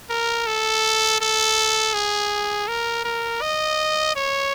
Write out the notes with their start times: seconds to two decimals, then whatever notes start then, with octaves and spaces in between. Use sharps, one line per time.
0.09 A#4
0.47 A4
1.21 A4
1.94 G#4
2.68 A#4
3.04 A#4
3.42 D#5
4.16 C#5